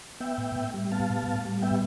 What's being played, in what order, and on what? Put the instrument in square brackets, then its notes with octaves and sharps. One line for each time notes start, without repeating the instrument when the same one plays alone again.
[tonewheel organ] B3 E5 G5
A2
A2
G3
B3 F5 A5
A2
A2
G3
B3 E5 G5